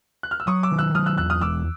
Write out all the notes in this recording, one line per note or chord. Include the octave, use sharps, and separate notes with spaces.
F#6
F6
E6
F#3 C#6 D#6
D6 E6
D#3
E6 F#6
F#3 D#6 F6
E6 F#6
E2 E6 F#6
D#6 F6
E1 D6 E6